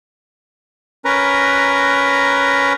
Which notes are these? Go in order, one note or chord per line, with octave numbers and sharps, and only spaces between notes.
C#4 A#4 B4 A#5